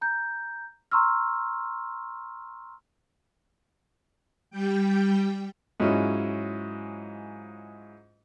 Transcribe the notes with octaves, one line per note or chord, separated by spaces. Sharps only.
A#5 G6
A#5 C6 C#6 E6 F6
G3 G5
G#2 F#3 G#3 C#4 E4 F4